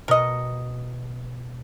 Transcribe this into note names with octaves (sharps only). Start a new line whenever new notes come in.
B2 A#4 D#5 C#7